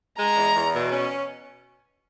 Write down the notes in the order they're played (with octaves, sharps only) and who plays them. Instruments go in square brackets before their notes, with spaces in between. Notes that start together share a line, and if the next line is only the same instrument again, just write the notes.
[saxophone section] G#3 [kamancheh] A#5
[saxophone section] E2
E2
B2
C#4